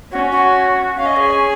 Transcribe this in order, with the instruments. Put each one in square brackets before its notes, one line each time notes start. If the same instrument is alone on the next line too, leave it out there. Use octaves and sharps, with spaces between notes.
[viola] C#4 [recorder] F#4
[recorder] F#4
[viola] C#4 [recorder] F5
[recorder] D#5
G#4